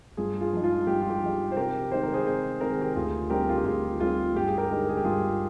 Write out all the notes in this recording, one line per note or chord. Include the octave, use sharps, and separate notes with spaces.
G2 F4 G#4
F4 G#4
F3 G#3 D#4
F4
G2 G4
F4
G4
F3 G#3 D#4
C5
C3 G4 A#4
D#3 G#3 C4 D#4 C5
A#4
G#4 C5
C3 G#4 C5
D#3 G#3 C4 D#4 A#4
G#4
G4 A#4
D2 F4 G#4
D3 G3 C4 D#4 G4 A#4
F4
G4
D2 F4 G#4
D3 G3 C4 D#4 F4 G#4
G2 G4
G#4
G4 A#4
D3 G#3 D#4
A#4
G#4
G4
G2 F4 G#4